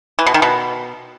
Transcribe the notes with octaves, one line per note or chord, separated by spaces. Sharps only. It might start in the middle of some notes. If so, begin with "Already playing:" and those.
E3
B2
D#3
B2